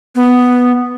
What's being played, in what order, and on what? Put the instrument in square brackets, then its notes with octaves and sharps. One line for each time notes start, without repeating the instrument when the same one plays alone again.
[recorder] B3